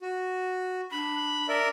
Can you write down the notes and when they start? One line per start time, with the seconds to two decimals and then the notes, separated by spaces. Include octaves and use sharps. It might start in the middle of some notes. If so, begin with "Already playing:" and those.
0.01 F#4
0.92 D4 B5
1.49 A#4 D5 E5